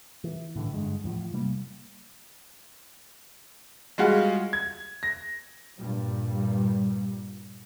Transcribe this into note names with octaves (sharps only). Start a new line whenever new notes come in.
E3
A2 D3 E3
G1 G2 D3 G#3
E2 A2 F3
C3 G3 A3 A#3
G3 G#3 F4 F#4 G#4
G#6
A#6
G2 A#2 G3